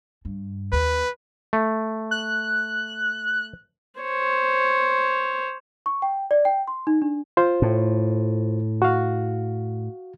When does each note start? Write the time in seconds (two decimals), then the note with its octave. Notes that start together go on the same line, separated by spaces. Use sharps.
0.25 G2
0.72 D#2 B4
1.53 A3
2.11 F#6
4.01 C5 C#5
5.86 C#6
6.02 G5
6.31 D5
6.45 G5
6.68 C6
6.87 D#4
7.02 D4
7.37 F4 C5
7.62 A2
8.82 F#4 F5